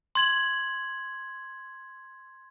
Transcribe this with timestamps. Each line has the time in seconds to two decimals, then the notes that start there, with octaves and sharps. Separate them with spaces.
0.15 C6 G#6 F#7